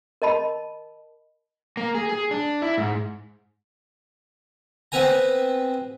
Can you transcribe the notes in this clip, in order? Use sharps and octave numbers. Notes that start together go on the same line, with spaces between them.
A#4 D#5 A5 B5
A#3
G#4
G#4
D4
E4
G#2
B3 C4 B4 G#5 A#5